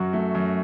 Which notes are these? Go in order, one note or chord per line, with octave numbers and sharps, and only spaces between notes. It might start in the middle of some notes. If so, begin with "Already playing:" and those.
Already playing: F#2 F#3 F#4
A3
F#2